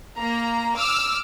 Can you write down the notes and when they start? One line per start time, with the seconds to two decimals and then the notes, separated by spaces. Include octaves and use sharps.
0.17 A#3 A#5
0.76 D6 E6 F6